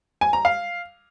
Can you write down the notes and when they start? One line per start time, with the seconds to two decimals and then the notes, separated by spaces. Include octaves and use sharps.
0.21 G#5
0.33 A#5
0.45 F5